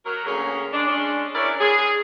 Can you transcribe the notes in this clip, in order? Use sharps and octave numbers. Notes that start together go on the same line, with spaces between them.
F#3 A#4
D2 A#3 C#4 G#4
G#3 D4
G#3 C#4 D4
C#4 D4 E4 A#4 C#5 D5
G#4